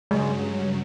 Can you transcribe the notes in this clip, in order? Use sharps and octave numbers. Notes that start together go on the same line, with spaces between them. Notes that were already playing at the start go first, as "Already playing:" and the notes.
G2 C#3 F#3 G#3